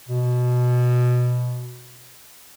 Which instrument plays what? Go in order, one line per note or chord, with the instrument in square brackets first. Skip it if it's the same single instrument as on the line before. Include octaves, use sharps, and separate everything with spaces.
[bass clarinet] B2